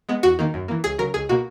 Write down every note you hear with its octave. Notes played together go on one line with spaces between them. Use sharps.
G#3 B3
E2 F#4
D#3 A#3
F#2
E3 A#3
C#2 G#4
C#3 F#3 A#4
C#2 G#4
B2 A#3 F#4